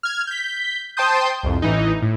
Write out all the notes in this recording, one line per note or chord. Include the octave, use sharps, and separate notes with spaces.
F6 G#6
G6 B6
C5 G5 A5 C6 D#6 G6
C2 F2
A1 E3 D#4
A2